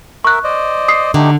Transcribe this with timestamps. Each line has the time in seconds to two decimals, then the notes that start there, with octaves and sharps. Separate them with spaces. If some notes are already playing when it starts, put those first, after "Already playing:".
0.25 A#4 E5 C#6 F#6
0.44 C5 D5 D#5
0.88 D#6 C7
1.14 D3 A3 D#4 G4